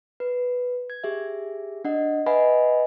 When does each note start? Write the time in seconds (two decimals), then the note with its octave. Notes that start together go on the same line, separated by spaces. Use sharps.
0.20 B4
0.90 G#6
1.04 G4 G#4 E5
1.85 D4 D#5 F#5
2.26 B4 D#5 E5 F#5 G#5 B5